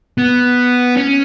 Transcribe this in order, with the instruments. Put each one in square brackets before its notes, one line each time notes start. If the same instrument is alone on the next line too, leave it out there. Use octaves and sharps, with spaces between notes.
[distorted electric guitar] B3
C#4